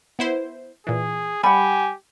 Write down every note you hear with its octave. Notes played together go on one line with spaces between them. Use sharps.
B3 E4 C5
A#2 E3 G#4
G3 G4 F#5 G#5 B5